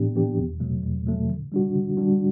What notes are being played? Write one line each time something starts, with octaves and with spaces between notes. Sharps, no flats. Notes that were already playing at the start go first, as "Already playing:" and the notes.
Already playing: A2 E3 B3 D4 G4
E3 B3 D4 G4
E2
B2 F#3 A3
E2
B2 F#3 A3
D3
G3 D4 F#4
D3
G3 D4 F#4